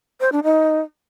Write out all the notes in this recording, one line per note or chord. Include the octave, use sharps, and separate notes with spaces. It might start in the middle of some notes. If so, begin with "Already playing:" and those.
C5
D4
D#4